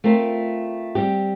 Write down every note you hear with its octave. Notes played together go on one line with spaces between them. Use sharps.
A3 C4 F4 A#4
G3 C4 G4